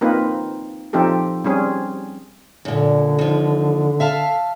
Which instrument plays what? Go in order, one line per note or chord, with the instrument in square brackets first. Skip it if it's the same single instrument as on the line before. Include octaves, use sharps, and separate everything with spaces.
[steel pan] A#3 C4 D#4 F4 B4
F3 C4 D#4 G4 A4
G3 C4 C#4 G#4
[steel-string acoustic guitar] F#2 A#2 [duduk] D3
[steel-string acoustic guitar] D#2 F3
E5 F5 A5